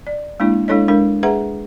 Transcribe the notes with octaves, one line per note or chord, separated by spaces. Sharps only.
D5
G#3 A#3 D4 E4
G#3 D4 E4 A4 C#5 D#5
G#3 D4 A#4
G#4 B4 E5 F#5 A#5